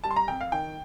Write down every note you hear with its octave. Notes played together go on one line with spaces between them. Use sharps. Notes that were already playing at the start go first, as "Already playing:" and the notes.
G3 A5
C6
A#5
F2 G5
F5
D#3 G5